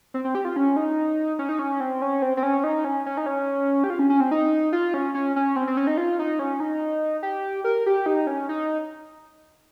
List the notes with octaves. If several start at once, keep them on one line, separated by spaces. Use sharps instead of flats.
C4
C4
G4
F4
C#4
D#4
C#4
D#4
C#4
C4
C#4
C4
C4
C#4
D#4
C#4
C#4
D#4
C#4
G4
F4
C#4
C#4
C4
D#4
F4
C#4
C#4
C#4
C4
C4
C#4
D#4
F4
D#4
C#4
D#4
G4
A#4
G4
D#4
C#4
D#4